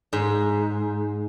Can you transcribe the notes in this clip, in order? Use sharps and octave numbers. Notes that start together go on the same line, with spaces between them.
G#2